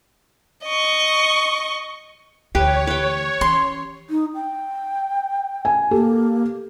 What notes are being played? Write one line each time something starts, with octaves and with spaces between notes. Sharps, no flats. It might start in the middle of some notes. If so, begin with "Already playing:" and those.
D#5 C#6
D2 E3 G4 B4 C#5
B4 G5
E3 C#4 C6
D#4
G5
G#5
A#3 G4 A4